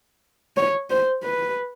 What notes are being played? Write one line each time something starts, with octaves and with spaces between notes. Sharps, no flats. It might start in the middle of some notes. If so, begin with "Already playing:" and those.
C#5
C5
B4